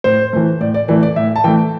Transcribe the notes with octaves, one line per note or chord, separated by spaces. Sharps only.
A2 C5
E3 A3
A2 D5
D5
E3 A3 D5
D5
A2 E5
A5
E3 A3 G5